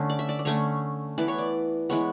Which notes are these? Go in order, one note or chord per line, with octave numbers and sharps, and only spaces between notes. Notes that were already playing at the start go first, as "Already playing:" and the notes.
Already playing: D3 A3 C#4
D5
E5
D5
D5
D3 A3 C#4 C#5
E3 B3 D5
C#5
D5
E3 G#3 B3 C#5